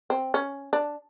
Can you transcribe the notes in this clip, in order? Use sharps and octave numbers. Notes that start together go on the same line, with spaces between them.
C4
C#4
D4